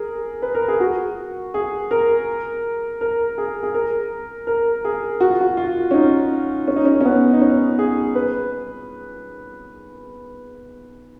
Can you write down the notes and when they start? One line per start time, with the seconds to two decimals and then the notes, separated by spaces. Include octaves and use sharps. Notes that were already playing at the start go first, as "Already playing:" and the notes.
Already playing: G#4 A#4
0.42 B4
0.55 A#4
0.68 G#4
0.80 F#4
1.54 G#4
1.91 A#4
3.01 A#4
3.38 G#4
3.63 G#4
3.74 A#4
4.47 A#4
4.85 G#4
5.20 F#4
5.30 F4
5.41 F#4
5.57 F4
5.91 C#4
5.94 D#4
6.68 C#4
6.76 D#4
6.85 C#4
7.01 C#4
7.05 B3
7.33 D#4
7.41 C#4
7.79 G#4
8.15 B4